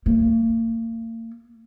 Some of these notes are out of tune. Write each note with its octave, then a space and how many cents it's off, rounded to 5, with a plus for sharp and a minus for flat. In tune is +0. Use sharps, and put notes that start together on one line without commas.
A#3 -40